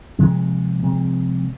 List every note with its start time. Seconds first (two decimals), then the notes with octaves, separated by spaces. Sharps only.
0.18 C3 F3 G#3 C4
0.82 C3 F3 G#3 C4